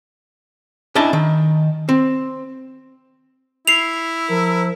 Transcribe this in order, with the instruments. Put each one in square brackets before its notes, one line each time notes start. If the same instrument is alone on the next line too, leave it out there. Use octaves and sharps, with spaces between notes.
[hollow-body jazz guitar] C#4 D4 E4 D#5 A5
D#3
C4
[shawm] E4 [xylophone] C7 F7
[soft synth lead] F3 [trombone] A#4